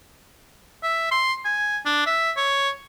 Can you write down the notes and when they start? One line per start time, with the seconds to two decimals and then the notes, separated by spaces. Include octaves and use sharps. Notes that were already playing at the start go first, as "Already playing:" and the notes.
0.83 E5
1.11 C6
1.45 G#5
1.85 D4
2.07 E5
2.37 C#5